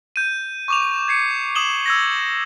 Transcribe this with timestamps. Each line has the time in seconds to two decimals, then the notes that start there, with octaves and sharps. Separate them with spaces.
0.16 G6 D#7
0.68 C#6 D6 F7
1.08 G#6 C7 C#7
1.55 D#6 E7 F#7 G7
1.86 E6 G#6 A#6